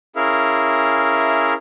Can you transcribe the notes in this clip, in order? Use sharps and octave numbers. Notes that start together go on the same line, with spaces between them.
C#4 E4 G#4 A#4 E5 F5